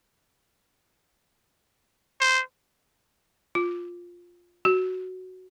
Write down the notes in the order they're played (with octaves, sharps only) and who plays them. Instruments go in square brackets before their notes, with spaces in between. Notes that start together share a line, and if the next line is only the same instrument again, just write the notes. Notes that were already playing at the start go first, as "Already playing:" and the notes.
[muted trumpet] C5
[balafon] F4
F#4